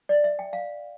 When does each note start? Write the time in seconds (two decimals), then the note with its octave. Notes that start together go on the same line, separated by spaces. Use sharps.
0.09 D5
0.24 E5
0.39 G5
0.53 F5